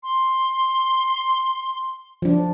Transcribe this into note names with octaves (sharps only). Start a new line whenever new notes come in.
C6
F3 D4